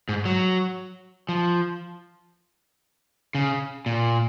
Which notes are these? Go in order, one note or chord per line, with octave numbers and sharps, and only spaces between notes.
G#2
F#3
F3
C#3
A#2